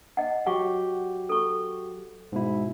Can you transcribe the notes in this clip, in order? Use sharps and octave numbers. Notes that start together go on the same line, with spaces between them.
D#5 F#5
F#3 F#4 G4 F#5 C#6
A4 C#6
G#2 B2 E4